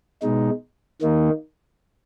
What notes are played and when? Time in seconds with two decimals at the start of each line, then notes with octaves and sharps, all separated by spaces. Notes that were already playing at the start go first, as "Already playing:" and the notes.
0.22 B2 G#3 D#4
1.02 D#3 A#3 D#4